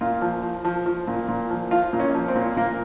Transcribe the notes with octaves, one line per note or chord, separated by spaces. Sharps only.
A#2 F4
F3
F3
F3
F3
A#2
A#2
F3
F3 F4
A#2
C#4
F3
C4
A#2
A#2 A#3